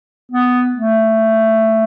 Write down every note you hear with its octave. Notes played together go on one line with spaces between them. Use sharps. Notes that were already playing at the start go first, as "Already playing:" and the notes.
B3
A3